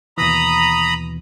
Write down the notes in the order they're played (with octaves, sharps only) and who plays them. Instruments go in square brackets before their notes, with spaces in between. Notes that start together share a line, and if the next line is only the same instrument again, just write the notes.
[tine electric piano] D#2 B2 E3 [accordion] A#5 B5 D#6